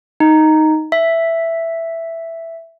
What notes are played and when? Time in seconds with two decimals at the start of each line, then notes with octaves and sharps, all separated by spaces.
0.20 D#4
0.92 E5